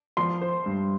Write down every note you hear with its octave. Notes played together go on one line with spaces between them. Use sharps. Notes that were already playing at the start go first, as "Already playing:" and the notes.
F3 C6
C5
G2